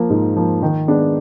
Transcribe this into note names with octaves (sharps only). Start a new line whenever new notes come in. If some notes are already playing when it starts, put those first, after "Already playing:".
Already playing: F3 A#3
G#2
F3 A#3
D#3
G#3 B3 D4